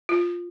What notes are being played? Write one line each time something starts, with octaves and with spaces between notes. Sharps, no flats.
F4